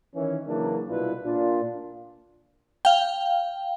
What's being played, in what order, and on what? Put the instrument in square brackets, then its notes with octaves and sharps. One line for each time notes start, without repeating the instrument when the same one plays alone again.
[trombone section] D#3 E3 C#4
C#3 E3 F#3 A#3 D4
C2 B2 D4 E4 F4 B4
A#2 D4 F4
[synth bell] F5 G5